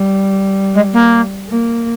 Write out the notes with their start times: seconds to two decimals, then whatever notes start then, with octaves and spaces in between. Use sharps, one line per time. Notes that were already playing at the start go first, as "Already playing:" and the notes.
Already playing: G3
0.74 G#3
0.93 A#3
1.49 A#3